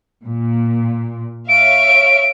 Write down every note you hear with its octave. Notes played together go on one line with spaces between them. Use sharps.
A#2
C#5 E5 F5 D7